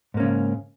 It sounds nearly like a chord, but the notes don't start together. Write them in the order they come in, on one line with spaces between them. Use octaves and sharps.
G#2 A#3 C#4 C#3